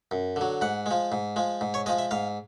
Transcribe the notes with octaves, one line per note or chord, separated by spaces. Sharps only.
F#2
D3 F#3
G#2 F#5
F3 G#3
G#2
F3 G#3
G#2
C#5
F3 G#3 D#5
E5
G#2 F5